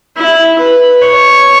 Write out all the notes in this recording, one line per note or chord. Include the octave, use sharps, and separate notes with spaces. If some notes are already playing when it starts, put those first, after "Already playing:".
E4
B4
C#5